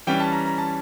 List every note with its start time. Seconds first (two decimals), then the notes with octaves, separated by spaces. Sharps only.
0.07 E3 G3 C#4 G5
0.20 A5
0.32 A#5
0.46 A#5
0.58 A5